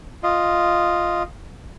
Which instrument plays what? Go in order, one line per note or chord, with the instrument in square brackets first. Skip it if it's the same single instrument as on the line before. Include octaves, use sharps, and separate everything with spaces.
[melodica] F4 D#5